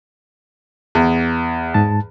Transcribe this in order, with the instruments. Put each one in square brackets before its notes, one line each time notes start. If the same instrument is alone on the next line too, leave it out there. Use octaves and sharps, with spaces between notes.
[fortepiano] E2
[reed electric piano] G#2 A5